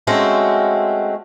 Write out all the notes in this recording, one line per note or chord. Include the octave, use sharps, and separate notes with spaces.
G#3 A3 C4 C#4 F#4